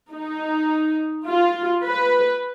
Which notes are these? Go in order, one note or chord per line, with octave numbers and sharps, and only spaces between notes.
D#4
F4
B4